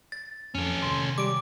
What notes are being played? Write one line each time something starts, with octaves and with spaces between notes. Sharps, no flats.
A6
F2 C#4 A4
C3 D#3 C6
G3 D6 D7